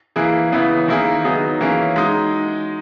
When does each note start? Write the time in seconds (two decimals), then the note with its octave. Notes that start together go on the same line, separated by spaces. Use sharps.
0.16 E3 A#3 E4 G#4
0.52 C#3 E3 B3 E4
0.88 D#3 A#3 E4 G#4
1.24 F#3 B3 D#4 G#4
1.61 E3 A#3 C#4 E4 G#4
1.96 G#3 D#4 F#4